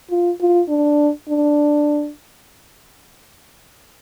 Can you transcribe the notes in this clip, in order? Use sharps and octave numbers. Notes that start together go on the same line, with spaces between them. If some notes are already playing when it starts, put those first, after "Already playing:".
F4
F4
D4
D4